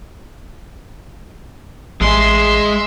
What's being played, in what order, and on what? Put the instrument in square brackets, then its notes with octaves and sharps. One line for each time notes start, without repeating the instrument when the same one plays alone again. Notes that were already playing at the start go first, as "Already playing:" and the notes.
[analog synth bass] A1 [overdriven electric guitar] G#3 G#4 [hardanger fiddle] E5 C6